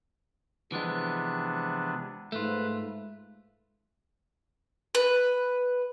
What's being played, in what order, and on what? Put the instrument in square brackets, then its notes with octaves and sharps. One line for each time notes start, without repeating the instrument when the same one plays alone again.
[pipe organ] C3 B3 D4 [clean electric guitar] E3 F3 G#3
[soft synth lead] G#2 [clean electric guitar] A3 F4 [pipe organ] B4
[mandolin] B4